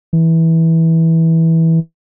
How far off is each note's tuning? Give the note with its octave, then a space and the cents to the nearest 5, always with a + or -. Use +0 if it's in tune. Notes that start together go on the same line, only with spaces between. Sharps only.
E3 -15